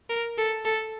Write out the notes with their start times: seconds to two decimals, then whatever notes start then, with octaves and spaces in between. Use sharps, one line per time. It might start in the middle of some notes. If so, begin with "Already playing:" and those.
0.09 A#4
0.38 A4
0.65 A4